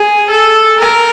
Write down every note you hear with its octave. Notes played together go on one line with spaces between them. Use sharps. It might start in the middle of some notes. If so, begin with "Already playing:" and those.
Already playing: G#4
A4
A#4